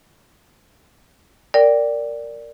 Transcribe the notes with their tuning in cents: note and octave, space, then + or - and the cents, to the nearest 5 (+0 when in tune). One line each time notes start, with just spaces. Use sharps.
A#4 -15 D5 -5 G5 +0